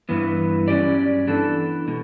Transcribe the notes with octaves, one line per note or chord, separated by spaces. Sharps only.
G2 E3 B3
G2 F#3 C#4 G4 D5
E3 B3 D4 A4
B2 G3